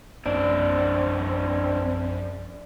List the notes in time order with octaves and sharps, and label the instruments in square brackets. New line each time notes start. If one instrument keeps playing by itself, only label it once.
[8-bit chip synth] A#1 F#2 [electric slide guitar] C4 D4 [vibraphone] D5